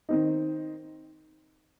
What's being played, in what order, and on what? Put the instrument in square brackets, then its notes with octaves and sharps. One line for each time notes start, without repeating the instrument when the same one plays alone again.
[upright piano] D#3 C4 D#4